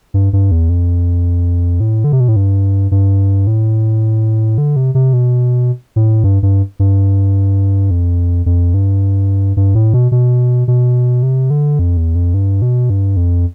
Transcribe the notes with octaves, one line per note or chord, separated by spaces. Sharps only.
G2
G2
E2
F2
A2
D3
C3
B2
A2
G2
G2
A2
D3
C3
C3
B2
A2
G2
G2
G2
F2
F2
G2
G2
A2
B2
B2
B2
C3
D3
F2
E2
F2
G2
B2
G2
F2